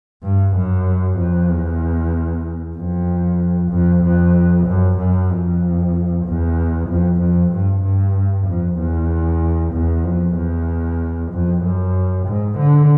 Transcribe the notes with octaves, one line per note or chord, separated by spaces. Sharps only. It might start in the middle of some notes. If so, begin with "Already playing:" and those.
G2
F#2
F2
E2
F2
F2
F2
F#2
F#2
F2
E2
F2
F2
G2
G2
F2
E2
E2
F2
E2
F2
F#2
G#2
D3